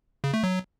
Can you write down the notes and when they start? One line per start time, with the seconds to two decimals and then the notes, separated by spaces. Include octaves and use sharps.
0.24 C#3
0.34 A3
0.43 F#3